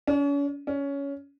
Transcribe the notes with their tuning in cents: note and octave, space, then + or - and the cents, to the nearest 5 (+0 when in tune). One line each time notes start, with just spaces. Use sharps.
C#4 +40
C#4 +15